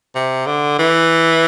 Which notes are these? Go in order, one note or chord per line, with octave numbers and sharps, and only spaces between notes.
C3
D3
E3